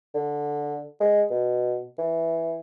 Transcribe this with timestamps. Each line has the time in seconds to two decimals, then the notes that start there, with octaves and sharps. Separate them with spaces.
0.14 D3
1.00 G#3
1.30 B2
1.98 E3